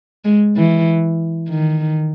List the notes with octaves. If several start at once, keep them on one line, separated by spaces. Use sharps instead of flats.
G#3
E3
D#3